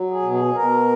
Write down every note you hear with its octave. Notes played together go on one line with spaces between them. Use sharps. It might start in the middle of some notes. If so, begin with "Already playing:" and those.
Already playing: F#3
G#4
B2
G#4
B2 A#4